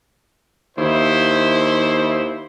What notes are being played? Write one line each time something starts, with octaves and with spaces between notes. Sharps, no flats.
D#2 E4 C5